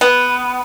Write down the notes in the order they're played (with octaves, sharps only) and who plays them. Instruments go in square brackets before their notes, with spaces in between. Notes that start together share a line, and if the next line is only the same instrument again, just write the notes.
[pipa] B3